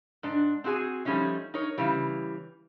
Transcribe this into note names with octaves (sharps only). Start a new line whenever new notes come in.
G#2 D4
C4 D4 F#4 G#4 G#5
F3 G3 A3 C#4 D#4
D#4 A#4 C#5
C#3 E3 G3